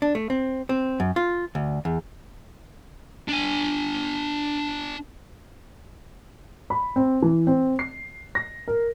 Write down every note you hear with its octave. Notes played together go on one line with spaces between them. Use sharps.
D4
A3
C4
C4
F#2
F4
D2
E2
D4 G#5
B5
C4
E3
C4
C7
A#6
A#4